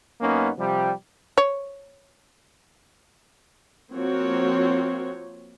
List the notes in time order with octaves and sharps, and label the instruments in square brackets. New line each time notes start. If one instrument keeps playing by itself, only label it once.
[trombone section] F#2 A#3 B3 C#4 D#4
C3 F3 G3
[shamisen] C#5
[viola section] F3 A#3 C4 F#4 C#5